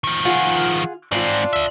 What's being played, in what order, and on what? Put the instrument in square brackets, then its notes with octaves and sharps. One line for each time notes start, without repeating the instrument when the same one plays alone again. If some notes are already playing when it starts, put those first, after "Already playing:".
[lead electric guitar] D#3 F3
[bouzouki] F4 G#4 F#5
[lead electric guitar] G#2 C4 [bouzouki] D4 F4
[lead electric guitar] D5 E5